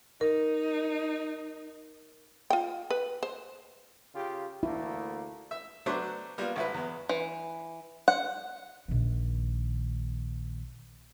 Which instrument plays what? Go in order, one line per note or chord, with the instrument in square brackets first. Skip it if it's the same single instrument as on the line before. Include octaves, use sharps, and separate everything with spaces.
[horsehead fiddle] D#4 [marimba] A#4
[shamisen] F4 G5
B4
C5
[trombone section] C#3 F4 G4
[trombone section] D2 A3 A#3 [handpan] E4
[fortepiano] E5
F#3 A3 B3 D4 C5 D5
G3 A#3 B3 F4
G#1 E4 B4
E2 B3
[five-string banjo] E3
F#5
[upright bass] A#1 D#3